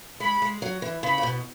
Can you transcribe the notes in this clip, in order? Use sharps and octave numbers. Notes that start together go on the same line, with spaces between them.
G#3 B5
G#3
F#3
E3
C#3 B5
G#2
B2